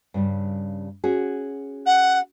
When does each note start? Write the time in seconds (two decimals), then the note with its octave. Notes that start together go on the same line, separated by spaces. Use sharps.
0.14 G2 C#3 G3
1.04 C#4 F#4 G#4
1.86 F#5